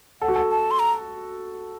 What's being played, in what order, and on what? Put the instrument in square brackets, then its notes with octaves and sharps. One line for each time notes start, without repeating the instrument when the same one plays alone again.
[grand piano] A4 [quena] F#5
[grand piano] F#4
A4
[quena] A5
C6
A#5